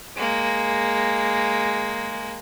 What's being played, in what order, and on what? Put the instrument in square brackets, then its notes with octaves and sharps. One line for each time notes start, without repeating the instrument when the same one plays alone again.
[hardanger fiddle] G#3 A#3